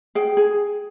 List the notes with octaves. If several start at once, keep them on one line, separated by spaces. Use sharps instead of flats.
G#4 G5
G#4